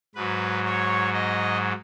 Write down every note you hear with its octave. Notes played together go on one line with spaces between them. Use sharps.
G#2 F#3 B4
C#5
D#5